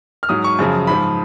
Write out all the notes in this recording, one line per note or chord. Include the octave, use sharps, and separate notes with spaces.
F6
G#2 F#3 D#6
C#6
F#2 C#3 F3
G#2 F3 B5